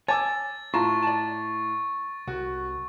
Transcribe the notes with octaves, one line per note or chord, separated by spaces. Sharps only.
C#5 G#5 A5 D6 E6 A6
A2 F4 A5 A#5 C#6
D5 A5
C2 F#4